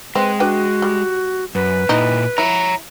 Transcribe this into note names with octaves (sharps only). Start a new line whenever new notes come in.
G#3 C4 B4
D4 F#4 B4 G5
G3
F#2 B4
A#2 D#4 E4
E4 C#5 A#5